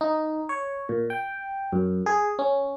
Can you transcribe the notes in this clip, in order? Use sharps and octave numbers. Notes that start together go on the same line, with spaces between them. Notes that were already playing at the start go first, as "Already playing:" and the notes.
D#4
C#5
A#2
G5
F#2
G#4
C#4